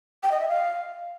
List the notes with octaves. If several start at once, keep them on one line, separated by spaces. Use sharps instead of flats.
G5
D#5
E5
F5